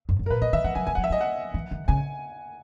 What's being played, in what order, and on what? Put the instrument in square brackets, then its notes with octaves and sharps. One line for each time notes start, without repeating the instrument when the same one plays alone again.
[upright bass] F#2
F#2
[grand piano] A#4
[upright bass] A#2 [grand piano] B4
[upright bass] C#3 [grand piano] D#5
[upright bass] D#3 [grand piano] E5
[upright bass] E3 [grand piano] F#5
[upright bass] F#3 [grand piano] G#5
[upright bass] E3 [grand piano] G#5
[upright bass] F#3 [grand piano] F#5
[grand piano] E5
[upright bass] F#3 [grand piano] D#5
[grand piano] F#5
[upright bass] E3
D#3
[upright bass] C#3 [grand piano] G#5